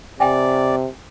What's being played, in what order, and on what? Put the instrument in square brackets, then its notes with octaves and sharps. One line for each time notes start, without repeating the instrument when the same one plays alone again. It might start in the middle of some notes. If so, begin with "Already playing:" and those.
[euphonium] C3 [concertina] D5 [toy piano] G5 G#5